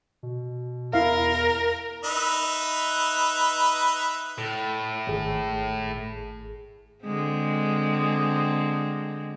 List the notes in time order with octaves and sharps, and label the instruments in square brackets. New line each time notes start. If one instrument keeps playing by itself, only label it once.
[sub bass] B2
[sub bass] E2 [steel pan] E4 F5 [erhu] A#4
[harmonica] D#4 B4 E5
[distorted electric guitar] A2
[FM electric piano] G#1 G#4
[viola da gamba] D3 G#3 C4